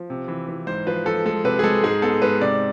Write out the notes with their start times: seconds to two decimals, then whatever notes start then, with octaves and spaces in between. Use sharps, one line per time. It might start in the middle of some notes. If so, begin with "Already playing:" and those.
Already playing: F3
0.10 C3
0.28 E3
0.49 E3
0.67 G#2 C5
0.87 F3 B4
1.05 F3 A4
1.25 G#3 A4
1.44 C3 B4
1.59 G#4
1.64 G#3 A4
1.83 G#2 G#4
2.02 B3 A4
2.22 G#2 B4
2.41 C3 D5